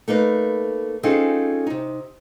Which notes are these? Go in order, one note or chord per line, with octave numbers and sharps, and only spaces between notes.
A3 A#3 D#4 B4
C4 C#4 D#4 F4 G#4 A4
C3 D#4